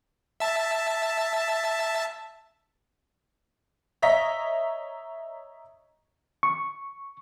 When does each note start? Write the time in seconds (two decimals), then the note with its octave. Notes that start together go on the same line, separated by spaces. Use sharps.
0.40 E5 A5
4.02 C#5 D#5 E5 A#5 A#6 B6
6.43 C#6